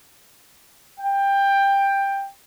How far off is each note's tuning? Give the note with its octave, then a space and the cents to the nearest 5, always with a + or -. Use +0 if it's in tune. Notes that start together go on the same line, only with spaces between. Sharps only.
G5 +15